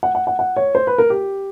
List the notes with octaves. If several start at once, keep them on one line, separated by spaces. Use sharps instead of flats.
F#5
F#5
F#5
F#5
C#5
C5
B4
A#4
G4